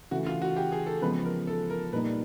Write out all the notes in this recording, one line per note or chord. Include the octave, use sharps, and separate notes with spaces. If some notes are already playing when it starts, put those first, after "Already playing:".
C#3 E3 A3 F#4
F4
F#4
G4
G#4
A4
C#3 F3 G#3 B3 B4
A#4
A4
A#4
A#2 G3 A#3 D#4 B4